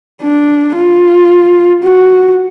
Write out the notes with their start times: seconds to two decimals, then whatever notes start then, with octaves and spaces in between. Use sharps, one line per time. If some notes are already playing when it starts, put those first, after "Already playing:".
0.22 D4
0.76 F4
1.83 F#4